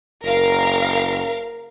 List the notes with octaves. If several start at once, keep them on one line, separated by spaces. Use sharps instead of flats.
F#1 A#4 F5